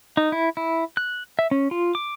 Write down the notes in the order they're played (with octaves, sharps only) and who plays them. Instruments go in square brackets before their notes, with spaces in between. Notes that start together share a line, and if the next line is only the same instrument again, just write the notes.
[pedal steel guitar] D#4
E4
E4
F#6
E5
C#4
F4
D6